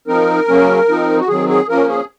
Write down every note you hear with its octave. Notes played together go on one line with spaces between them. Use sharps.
F3 C4 D#4 A#4
C#3 F#3 A#3 C#4
F3 C4 D#4
F#4
D#3 F#3 C4 G#4
G#4
F3 A#3 C#4 A#4
G#4